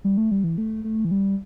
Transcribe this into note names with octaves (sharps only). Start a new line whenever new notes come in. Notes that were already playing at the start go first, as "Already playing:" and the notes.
G3
A3
G3
E3
A3
A3
E3
G3